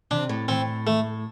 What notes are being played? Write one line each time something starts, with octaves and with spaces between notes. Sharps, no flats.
C3 D4
A2
A2 C4
A3